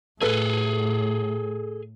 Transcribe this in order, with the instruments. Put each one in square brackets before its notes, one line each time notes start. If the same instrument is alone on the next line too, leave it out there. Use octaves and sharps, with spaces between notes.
[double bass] A2 [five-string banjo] A3 B4 [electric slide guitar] G#4 A4